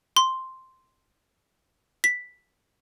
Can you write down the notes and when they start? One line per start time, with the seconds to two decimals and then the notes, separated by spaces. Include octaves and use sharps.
0.17 C6
2.04 B6